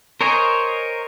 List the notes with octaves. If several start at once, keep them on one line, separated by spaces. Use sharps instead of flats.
A#4 C5 C#5 D#5 G#5